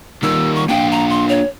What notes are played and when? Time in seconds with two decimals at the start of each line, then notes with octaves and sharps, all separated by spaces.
0.23 D#3 G3 A#3 E6
0.55 C#6
0.69 A#3 D4 F5 G5
0.92 A#5
1.09 C6
1.29 C#5